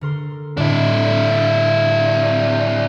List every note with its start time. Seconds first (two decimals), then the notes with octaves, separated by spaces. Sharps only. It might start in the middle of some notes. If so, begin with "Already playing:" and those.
0.01 D3 A#4 C6
0.57 A2 D3 G3 D4 E4
1.28 D5